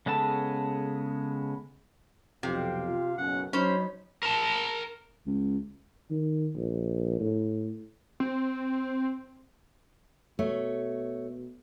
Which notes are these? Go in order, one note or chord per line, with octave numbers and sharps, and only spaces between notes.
C#3 G#3 B3 A4 A5
B1 F2 C3 F5 G5
F4
F#1 B1 C#4 F#5
F#3 C#4 D#4 C5 C#5 B5
A#4 A5
C#2
D#3
A#1
A2
C4
B2 A3 C#5